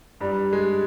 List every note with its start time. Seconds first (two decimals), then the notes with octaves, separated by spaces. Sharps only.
0.21 G2 G3
0.53 G#3